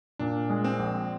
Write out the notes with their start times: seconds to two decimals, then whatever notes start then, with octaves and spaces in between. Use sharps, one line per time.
0.19 A#2 D4
0.50 G#3
0.64 C4
0.79 A#1